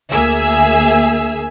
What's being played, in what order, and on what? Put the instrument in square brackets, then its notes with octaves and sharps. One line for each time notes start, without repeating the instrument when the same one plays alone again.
[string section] D2 A#3 G#4 E5 G#5 E6